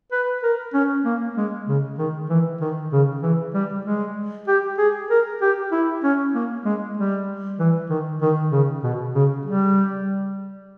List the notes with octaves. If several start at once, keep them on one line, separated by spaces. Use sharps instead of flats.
B4
A#4
C#4
A#3
G#3
C#3
D#3
E3
D#3
C#3
E3
G3
G#3
G4
G#4
A#4
G4
E4
C#4
A#3
G#3
G3
E3
D#3
D#3
C#3
B2
C#3
G3